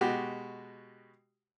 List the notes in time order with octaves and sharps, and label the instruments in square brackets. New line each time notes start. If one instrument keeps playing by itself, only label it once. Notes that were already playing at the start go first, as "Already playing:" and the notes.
[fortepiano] B2 G#3 F#4 G4